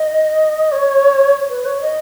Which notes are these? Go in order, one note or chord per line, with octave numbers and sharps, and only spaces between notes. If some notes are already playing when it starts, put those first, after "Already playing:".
Already playing: D#5
C#5
B4
C#5
D#5